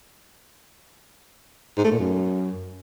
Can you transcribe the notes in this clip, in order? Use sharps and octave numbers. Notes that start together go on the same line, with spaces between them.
G#2
A3
A#2
F#2